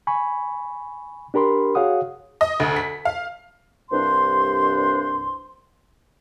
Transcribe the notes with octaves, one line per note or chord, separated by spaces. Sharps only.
G#5 B5 C#6
D4 G4 A#4 B5 C6
F#4 G#4 C#5 F5 F#5 D#6
D#5
D2
B6
F5
C2 G2 D4 C5 C6